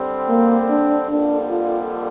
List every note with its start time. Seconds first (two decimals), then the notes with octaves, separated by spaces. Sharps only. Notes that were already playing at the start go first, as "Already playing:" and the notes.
Already playing: D3 G3 C4
0.29 A#3
0.70 D4
1.09 F2 D3 G3 A#3 D4
1.50 F4